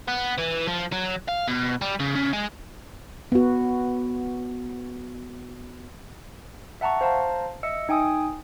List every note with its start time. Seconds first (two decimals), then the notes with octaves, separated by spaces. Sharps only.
0.08 B3
0.38 E3
0.68 F3
0.92 F#3
1.28 F5
1.48 B2
1.82 G3
2.00 C#3
2.16 C#3
2.33 G#3
3.32 B3 F#4
6.81 E5 F#5 A5 A#5 C#6
7.01 C5 F5 A5 A#5
7.63 D#5 E5 E6 C#7
7.89 D#4 G5 G#5 D#6